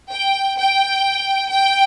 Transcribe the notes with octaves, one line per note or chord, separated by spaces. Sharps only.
G5
G5
G5